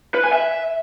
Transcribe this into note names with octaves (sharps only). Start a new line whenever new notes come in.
B4
G#5
E5